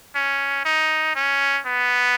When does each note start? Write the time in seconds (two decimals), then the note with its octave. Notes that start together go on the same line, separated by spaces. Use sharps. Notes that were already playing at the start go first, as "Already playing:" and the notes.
0.16 C#4
0.65 D#4
1.15 C#4
1.66 B3